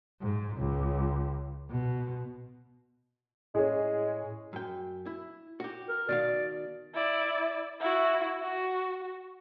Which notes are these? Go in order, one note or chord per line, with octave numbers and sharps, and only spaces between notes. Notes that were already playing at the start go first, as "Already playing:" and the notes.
G#2
C#2
B2
A2 G#3 C#4 G#4
F#2 G5
E4
F#4 G4
A#4
B2 D#3 D5 F5
E4 D5
E4 F#4
F#4